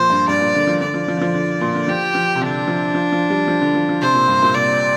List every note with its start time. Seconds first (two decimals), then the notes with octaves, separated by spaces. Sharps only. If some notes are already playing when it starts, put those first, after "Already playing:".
Already playing: A#2 F3 C5
0.10 G2
0.28 G2 D5
0.41 A#2
0.55 D3
0.67 F3
0.81 D3 D5
0.94 F3
1.08 F3
1.17 D3
1.21 F3
1.34 D3
1.61 A#2
1.75 D3
1.88 F3 G4
2.15 F3
2.35 C3
2.41 D3 D4
2.68 F3
2.95 F3
3.12 F3
3.30 G3
3.48 F3
3.61 D3
3.75 F3
3.89 F3
4.01 C3 C5
4.14 A#2
4.28 G2
4.42 A#2
4.55 C3 D5